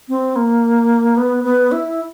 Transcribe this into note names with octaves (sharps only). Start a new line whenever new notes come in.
C4
A#3
B3
B3
E4